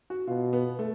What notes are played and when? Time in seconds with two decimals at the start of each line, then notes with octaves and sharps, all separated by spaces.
0.10 F#4
0.27 B2 F4
0.53 B3
0.79 A3